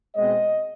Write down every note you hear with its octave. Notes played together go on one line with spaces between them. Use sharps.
B2 G#3 C4 D#5